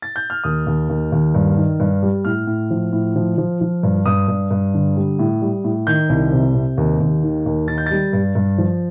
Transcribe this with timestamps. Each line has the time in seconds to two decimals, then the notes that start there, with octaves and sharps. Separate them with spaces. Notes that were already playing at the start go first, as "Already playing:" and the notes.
0.02 A6
0.16 G6
0.30 F6
0.44 D#2 D#6
0.67 D#2
0.89 D#2
1.12 D#2
1.35 G2
1.57 D#3
1.80 G2
2.03 G3
2.25 A2 F6
2.47 A2
2.70 F3
2.93 A2
3.16 F3
3.38 F3
3.61 F3
3.83 G2
4.06 G2 D#6
4.28 G2
4.51 G2
4.74 D3
4.96 G3
5.19 A2
5.42 G3
5.64 A2
5.87 D#3 G6
6.10 C2
6.32 C3
6.55 C3
6.77 D#2
7.00 D#2
7.23 D#3
7.46 D#2
7.68 D#3 A6
7.78 G6
7.86 G3 A6
8.13 G2
8.35 G2
8.58 F3